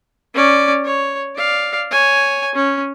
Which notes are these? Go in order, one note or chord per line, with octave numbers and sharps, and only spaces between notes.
C#4 D5
C#5
D5 F5
C#5 G#5
C#4